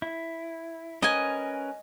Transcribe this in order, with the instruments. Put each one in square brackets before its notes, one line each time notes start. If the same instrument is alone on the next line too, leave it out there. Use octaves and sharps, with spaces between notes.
[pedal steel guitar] E4
[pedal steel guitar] C#4 A#4 B4 [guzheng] D#5 G#5